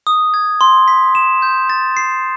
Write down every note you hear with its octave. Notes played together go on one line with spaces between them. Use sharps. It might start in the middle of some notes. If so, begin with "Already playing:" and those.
D#6
G#6
C6
B6
E7
G6
A6
C7